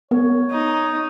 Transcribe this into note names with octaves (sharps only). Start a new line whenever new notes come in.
B3 A#4 C#5
D#4